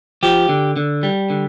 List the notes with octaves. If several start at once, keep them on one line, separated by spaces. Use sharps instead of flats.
F3 G4
D3
D3
G3
D3